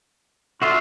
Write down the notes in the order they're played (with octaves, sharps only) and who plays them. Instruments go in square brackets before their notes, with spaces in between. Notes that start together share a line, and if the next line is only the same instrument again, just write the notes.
[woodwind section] A3 D4 F4 [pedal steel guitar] F#4 E5 C6